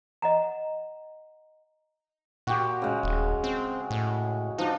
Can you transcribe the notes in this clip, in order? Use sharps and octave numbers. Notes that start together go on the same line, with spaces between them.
D#5 F#5 A#5
A#2 F#4 G4
C#3 G#3
D#1
C4
A2
F3 D4 D#4